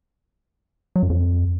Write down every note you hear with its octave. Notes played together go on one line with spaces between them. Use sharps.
F#3
F#2
F2